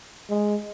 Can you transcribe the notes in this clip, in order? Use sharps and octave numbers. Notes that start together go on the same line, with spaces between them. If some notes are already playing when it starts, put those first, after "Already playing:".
G#3